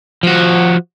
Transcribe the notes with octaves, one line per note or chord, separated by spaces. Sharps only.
F3 F#4